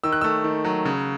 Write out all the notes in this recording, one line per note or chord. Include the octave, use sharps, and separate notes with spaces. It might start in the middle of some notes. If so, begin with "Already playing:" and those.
D#3 E6
F#6
A3 E6
D#3
F#3
C#3